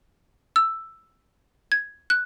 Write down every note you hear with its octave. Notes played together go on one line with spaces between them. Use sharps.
E6
G#6
F#6